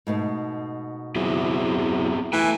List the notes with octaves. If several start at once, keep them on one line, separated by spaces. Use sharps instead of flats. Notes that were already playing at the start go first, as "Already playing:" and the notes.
G#2 B2 A3
F#3 B3 C4 E4 G#4
E3 A3 G5 G#5